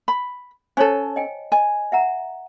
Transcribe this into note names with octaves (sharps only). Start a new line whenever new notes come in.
B5
C#4 A4 C5 C#5 A5
D#5 G5 G#5
D#5 G#5
E5 F#5 A#5